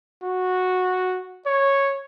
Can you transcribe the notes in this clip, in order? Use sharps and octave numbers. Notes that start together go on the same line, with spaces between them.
F#4
C#5